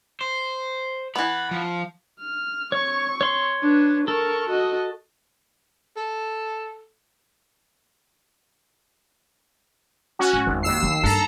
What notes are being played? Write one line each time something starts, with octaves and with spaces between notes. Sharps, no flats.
C5
E3 B3 B5
F3
F6
C4 C#5 C#6
C#5 C6
D4 B4
A4 A#4 C#6
F#4 D#5
A4
C#4 F#4
G#2
G#1 F2 G3
D#2 E6 C7
D#3
G2 A4 A#5